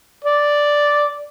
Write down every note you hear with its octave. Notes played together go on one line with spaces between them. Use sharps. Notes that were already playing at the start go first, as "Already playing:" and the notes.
D5